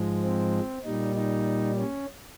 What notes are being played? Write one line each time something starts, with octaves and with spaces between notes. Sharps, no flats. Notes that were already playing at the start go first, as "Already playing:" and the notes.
Already playing: G#2 F3 G#3
C4
A#2 G3 D#4
D#4
C#4